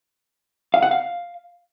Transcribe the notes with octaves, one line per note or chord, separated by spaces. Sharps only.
F5
F#5
F5